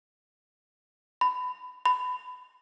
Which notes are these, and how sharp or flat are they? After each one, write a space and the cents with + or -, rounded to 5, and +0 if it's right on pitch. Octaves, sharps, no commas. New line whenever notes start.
B5 +20
B5 +20